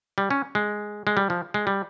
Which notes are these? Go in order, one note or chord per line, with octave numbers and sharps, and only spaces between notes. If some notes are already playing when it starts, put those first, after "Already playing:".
G3
C#4
G#3
G#3
G3
F3
G#3
G3